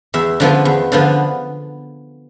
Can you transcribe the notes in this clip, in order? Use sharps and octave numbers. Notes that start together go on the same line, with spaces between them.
E2 E5
D3 F3 B3
E2
D3 F3 B3